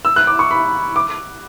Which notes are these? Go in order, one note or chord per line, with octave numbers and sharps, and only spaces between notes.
E6
F#6
D6
C#6
B5
D6